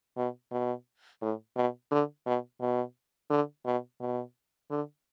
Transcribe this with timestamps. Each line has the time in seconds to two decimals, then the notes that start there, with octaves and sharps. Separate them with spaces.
0.17 B2
0.51 B2
1.22 A2
1.56 B2
1.91 D3
2.26 B2
2.60 B2
3.30 D3
3.65 B2
4.00 B2
4.70 D3